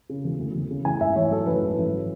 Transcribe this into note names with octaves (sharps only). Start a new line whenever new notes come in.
C#3
E1
D2
E1
C#3
A1 G#5
G#2 E5
A1 C#5
F#3 A4
A1 B4
G#2
A1
F#3